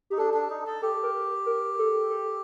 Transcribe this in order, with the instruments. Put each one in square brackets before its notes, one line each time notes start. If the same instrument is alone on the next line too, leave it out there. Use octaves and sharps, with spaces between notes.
[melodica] D#4 [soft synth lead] G4
[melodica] D4 [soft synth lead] A4
[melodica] D4
D#4
A4
[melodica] G4 [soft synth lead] A4
[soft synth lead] A#4
A#4
A4
A4